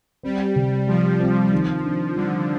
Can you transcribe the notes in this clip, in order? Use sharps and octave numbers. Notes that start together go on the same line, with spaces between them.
G3 C4
C3
F3 G3
C4
D#3
D4
D3 G3